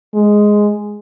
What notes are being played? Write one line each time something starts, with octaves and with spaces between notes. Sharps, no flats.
G#3